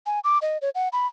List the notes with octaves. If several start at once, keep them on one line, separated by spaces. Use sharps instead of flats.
G#5
D6
D#5
C#5
F#5
B5